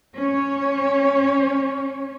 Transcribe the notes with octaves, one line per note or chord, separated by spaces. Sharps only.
C#4 C#5